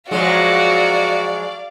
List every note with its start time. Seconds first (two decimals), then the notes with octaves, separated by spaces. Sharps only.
0.11 F3 F#3 G#3 F#4 D5 F5